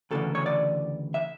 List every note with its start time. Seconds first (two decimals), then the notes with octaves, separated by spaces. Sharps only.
0.11 D2 C#3 E3 A4
0.35 C#5
0.46 D5
1.14 E5